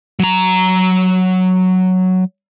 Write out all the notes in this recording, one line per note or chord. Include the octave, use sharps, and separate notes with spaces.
F#3 A#5